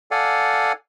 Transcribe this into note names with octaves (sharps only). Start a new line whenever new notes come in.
A4 D5 F5 F#5 G#5